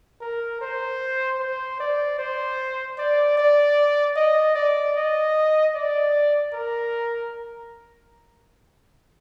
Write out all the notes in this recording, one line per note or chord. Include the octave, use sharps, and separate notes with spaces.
A#4
C5
C5
D5
C5
D5
D5
D#5
D5
D#5
D5
A#4